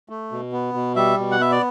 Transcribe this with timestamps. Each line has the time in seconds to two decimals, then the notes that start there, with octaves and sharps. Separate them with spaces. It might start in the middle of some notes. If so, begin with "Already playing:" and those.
0.09 A3
0.32 B2
0.52 B3
0.74 B2
0.96 G3 E5
1.18 B2
1.31 F#5
1.39 B3 E5
1.51 D5